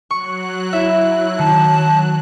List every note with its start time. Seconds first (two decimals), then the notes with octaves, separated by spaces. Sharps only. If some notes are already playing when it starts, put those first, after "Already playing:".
0.11 F#3 C#6 F#6
0.73 E4 E5
1.39 D#3 A5